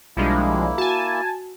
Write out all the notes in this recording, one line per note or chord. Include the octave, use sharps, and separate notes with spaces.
B1 F3 G3 G#3 A#3 D4 E4
F#4 G#5 A5